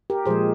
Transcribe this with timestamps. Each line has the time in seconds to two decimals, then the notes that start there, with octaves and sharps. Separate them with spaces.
0.10 G4 A#4
0.26 A#2 F3 G#3 G#4 C5